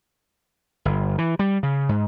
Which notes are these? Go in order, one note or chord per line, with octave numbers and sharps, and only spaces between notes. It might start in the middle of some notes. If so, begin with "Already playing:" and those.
G1
E3
G3
C#3
G#2